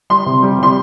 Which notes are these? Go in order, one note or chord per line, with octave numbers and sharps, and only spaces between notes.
G3 C6
C3
G3
C3 C6